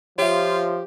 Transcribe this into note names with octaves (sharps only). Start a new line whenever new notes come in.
F3 F4 G4 C#5 E5